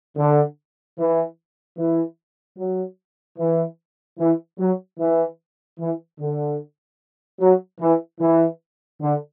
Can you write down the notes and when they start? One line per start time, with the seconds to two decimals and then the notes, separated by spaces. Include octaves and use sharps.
0.17 D3
0.98 E3
1.78 E3
2.57 F#3
3.39 E3
4.19 E3
4.59 F#3
4.99 E3
5.79 E3
6.20 D3
7.40 F#3
7.81 E3
8.20 E3
9.01 D3